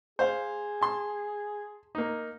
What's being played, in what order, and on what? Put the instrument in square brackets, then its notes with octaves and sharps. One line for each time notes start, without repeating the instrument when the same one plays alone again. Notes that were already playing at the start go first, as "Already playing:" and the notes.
[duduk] G#4 [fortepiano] C5 F5
[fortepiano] A5 C6
A#3 D#4